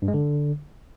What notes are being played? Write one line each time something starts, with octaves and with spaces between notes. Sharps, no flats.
G2
G#3
D3